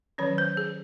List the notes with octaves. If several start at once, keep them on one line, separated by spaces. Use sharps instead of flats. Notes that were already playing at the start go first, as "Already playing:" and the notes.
D#3 F#3 C#4 C#5
C5
G#4